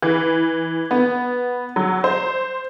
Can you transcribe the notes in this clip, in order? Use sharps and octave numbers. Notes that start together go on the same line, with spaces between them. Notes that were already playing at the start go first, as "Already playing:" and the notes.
E3
B3
F#3
C5